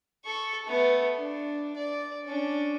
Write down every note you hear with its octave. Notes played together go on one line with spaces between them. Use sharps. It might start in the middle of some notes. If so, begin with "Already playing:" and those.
A4 C#6
A3 B3
D4
D5
C#4 D4